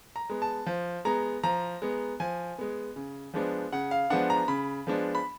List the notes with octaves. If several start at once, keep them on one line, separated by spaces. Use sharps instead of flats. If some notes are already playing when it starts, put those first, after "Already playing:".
A#5
G#3 B3
A5
F3
G#3 B3 A#5
F3 A#5
G#3 B3
F3 G#5
G#3 B3
C#3
F3 G#3 B3 D4
C#3 F#5
F5
F3 G#3 B3 D4 F#5
A#5
C#3 B5
F3 G#3 B3 D4
B5